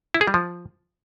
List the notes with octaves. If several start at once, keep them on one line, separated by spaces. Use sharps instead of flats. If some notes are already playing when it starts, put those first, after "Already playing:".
E4
G#4
G3
F3